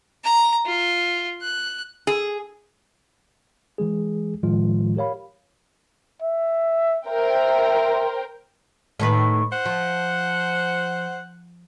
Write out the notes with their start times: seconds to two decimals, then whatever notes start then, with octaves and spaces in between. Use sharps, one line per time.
0.24 A#5
0.66 F4
1.42 F#6
2.07 G#4
3.78 E3 G#3 G#4
4.43 A2 D#3 F3 G#3 F4
4.96 G4 A#4 C#5 F5 B5
6.22 E5
7.07 A#4 C5 E5 G5
9.00 A2 D#3 B4
9.52 C5 F#5
9.66 F3